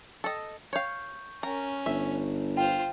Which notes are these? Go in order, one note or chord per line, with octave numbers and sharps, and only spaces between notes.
A4 D#5
C#5 F5 C#6 G6
C#4 A#4
G1 E5
F4 C5 G5